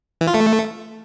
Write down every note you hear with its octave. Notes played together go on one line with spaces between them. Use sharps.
E3
F4
A3